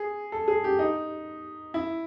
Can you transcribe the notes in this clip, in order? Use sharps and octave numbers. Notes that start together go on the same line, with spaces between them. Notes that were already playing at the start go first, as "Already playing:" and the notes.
Already playing: G#4
A4
G#4
G4
D#4
E4